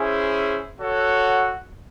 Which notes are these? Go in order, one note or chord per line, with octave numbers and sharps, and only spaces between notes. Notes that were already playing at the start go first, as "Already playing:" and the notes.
Already playing: C#4 E4 G#4 C5
F#4 A4 C#5 F#5